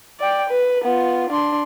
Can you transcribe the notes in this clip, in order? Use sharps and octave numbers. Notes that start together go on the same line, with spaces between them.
D5 G5
B4
B3 F4
D4 C6